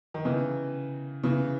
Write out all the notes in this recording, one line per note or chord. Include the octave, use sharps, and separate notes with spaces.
D#3
C#3 E3
C#3 E3